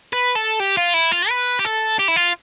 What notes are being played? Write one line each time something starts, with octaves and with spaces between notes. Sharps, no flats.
B4
A4
G4
F4
E4
F4
B4
G4
A4
G4
E4
F4